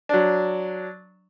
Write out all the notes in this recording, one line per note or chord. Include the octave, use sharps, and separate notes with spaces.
F#3 D4